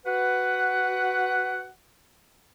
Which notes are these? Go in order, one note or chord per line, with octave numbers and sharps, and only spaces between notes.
F#4 B4 F#5